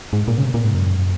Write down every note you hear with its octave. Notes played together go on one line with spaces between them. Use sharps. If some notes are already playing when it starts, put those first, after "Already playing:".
G#2
A#2
C#3
C3
A#2
G#2
F#2